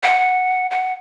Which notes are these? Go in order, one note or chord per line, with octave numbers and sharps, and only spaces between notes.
F#5
F#5